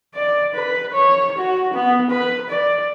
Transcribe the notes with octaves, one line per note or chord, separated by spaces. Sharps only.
D5
B4
C#5
F#4
B3
B4
D5